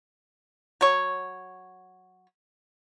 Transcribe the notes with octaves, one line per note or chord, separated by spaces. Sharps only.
F#3 C#5